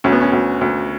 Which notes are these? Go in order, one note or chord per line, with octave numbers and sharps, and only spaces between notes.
D2 C#4
B3
C#4
D2
D2